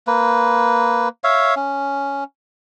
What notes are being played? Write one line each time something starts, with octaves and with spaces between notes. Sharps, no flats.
A#3 B4
C#5 E5 F5
C#4